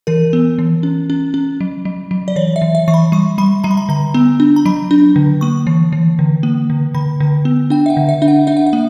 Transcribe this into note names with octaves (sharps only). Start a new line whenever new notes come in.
E3 A#4
B3
E3
C#4
C#4
C#4
F#3
F#3
F#3
D5
E3 C#5
E5
E3
E5
E3 C#6
B5
G3 C#6
G3 B5
G3 A#5
B5
A#5
D3 A#5
B3
D4
A#5
F#3 B5
D4
D3
A#3 C#6
E3
E3
D3
A#3
D3
D3 B5
D3
B3
D4 G5
E5
F#5
D3
E5
D4 E5
F#5
D4 E5
F#5
E5
A#3